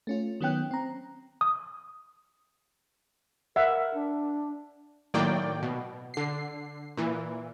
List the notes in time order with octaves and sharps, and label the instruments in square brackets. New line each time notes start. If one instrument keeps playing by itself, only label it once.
[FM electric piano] A3 C#4 F4
D#3 F#3 B3 C#4 G5 F#6
C4 A#5
[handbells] D#6
[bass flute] A#4 [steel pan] E5 F#5
[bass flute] D4
[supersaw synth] A2 D#3 F#3 A#3 D5 G5
B2
D3 C7
A#2 E3